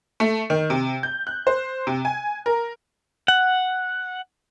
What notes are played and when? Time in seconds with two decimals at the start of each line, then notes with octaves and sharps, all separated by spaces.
0.20 A3
0.50 D#3
0.70 C3
1.03 G6
1.27 F#6
1.47 C5
1.87 C3
2.05 G#5
2.46 A#4
3.28 F#5